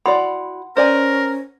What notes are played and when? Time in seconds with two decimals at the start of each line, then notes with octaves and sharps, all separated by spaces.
0.06 E4 F#4 D5 F#5 B5 C6
0.77 C#4 A#4 C5 D5 G#5